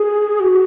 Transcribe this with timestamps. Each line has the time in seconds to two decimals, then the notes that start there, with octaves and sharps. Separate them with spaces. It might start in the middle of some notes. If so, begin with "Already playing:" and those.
Already playing: G#4
0.40 F#4